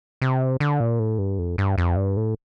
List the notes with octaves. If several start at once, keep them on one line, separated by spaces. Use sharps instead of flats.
C3
D3
A#2
A2
G2
F2
G2
F2
G2
A2